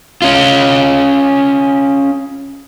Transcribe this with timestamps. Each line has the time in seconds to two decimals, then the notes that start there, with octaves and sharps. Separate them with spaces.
0.22 C#4 F4